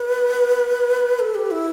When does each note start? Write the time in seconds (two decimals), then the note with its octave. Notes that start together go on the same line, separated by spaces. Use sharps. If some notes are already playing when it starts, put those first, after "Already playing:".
Already playing: B4
1.19 A4
1.35 G4
1.51 E4